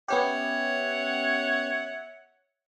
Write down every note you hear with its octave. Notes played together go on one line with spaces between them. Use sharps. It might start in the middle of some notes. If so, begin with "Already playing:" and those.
B3 C#4 G4 C#5 E5 F#5